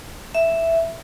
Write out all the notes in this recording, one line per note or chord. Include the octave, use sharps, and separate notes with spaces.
E5